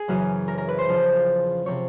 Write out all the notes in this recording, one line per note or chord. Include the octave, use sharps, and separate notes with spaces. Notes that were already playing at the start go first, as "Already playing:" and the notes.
Already playing: G#4
F#2 C#3 E3
A#4
A#4
B4
C5
E2 C#3 F3
C3 F3 C#5